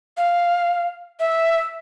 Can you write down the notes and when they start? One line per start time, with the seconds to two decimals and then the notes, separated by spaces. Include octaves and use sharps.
0.17 F5
1.20 E5